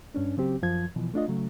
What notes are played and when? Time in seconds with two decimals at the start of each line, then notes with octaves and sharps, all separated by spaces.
0.14 G2 C#4 D4
0.37 C#3 F#3 C4 G4
0.62 F#2 F3 G#6
0.96 B2 E3 F3
1.14 A3 D4 F4 D#5
1.28 C#3 F#3 A3